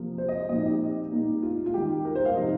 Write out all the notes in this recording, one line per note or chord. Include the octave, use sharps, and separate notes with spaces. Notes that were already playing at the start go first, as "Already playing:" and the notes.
Already playing: C3 F3 A#3
C5
D#5
A#2 F3 C4 D#4 D#5
G4
A#2 G3 A#3 D#4
F4
F4
D#3 G3 D#4 G4
A#4
C5
F5
C3 F3 D#4 D#5